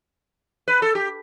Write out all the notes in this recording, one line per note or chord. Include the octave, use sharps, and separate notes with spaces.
B4
A4
G4